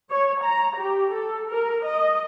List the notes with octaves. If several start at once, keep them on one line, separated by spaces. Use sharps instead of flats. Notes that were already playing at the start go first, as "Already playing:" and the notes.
C#5
A#5
G4
A4
A#4
D#5